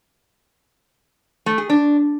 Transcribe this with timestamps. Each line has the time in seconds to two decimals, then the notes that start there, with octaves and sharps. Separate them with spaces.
1.46 A3
1.58 G#4
1.69 D4